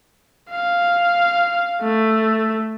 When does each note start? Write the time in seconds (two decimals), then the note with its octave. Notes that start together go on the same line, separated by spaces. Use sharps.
0.51 F5
1.82 A3